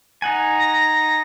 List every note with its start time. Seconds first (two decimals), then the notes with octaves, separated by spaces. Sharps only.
0.22 D#4 F#5 G#5
0.59 A#6